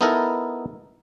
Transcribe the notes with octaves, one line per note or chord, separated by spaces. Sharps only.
B3 D#4 E4 A4 A#4